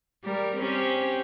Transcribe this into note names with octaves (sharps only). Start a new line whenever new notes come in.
G3 A#4
C4 C#4 G4